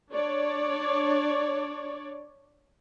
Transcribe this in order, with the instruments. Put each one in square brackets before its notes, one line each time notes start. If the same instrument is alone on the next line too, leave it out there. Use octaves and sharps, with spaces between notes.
[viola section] D4 C#5 D5